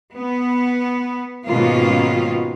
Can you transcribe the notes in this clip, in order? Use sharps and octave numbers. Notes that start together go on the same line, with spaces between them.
B3
G#2 B2 D#3 A#3 C#4 F4